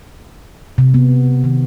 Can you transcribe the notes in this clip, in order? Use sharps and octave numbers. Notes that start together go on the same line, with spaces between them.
C3
B3
D#3